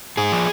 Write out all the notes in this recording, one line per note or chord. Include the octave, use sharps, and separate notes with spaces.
G#2 G#4
F3